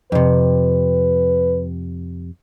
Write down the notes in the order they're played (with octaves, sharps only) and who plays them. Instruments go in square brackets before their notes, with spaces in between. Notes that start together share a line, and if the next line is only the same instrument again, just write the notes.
[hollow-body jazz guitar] F2 C3 [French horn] B4